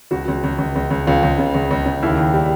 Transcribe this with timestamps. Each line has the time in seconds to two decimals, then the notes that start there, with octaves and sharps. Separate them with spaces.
0.11 C#2 F#4
0.28 C#2
0.44 C#2
0.59 C#2
0.76 C#2
0.91 C#2
1.06 C#2 F4
1.23 C#2
1.38 C#3
1.54 C#2
1.71 C#2
1.86 C#3
2.02 D#2 E4
2.18 D#3
2.34 G3